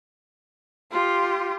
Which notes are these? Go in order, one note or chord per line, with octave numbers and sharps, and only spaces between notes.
F4 G4